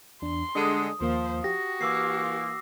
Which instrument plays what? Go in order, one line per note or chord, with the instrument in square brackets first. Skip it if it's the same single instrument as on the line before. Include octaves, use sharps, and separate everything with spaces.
[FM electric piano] E2 D4 [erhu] C6
[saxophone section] D3 G3 G#3 [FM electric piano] D4 G#4 A4 [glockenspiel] D#6
[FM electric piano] D#2 A#3 [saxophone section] F3 [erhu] C5
[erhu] F#4 [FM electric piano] G4 [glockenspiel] A#6
[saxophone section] E3 A#3 [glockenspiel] D6 E6 C7